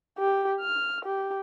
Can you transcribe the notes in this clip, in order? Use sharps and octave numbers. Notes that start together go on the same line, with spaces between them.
G4
F6
G4